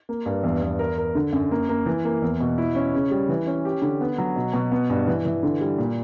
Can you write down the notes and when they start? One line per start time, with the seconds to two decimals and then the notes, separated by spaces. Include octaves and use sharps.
0.09 A#3
0.26 G2
0.44 E2
0.62 E2
0.79 A#4
0.98 A#4
1.15 D3
1.33 F#2
1.51 A#3
1.69 A#3
1.86 E3
2.05 A#3
2.22 E2
2.40 B2
2.58 E4
2.75 C#4
2.94 C#3
3.11 G3
3.29 E3
3.47 C#4
3.65 G4
3.82 D3
4.01 B3
4.18 F#3
4.36 B2
4.53 B2
4.72 B3
4.90 G2
5.07 E3
5.25 E3
5.43 D3
5.61 G3
5.78 A#2